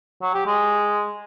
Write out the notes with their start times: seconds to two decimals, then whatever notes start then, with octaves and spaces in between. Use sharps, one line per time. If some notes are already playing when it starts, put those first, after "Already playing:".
0.22 F#3
0.34 G4
0.46 G#3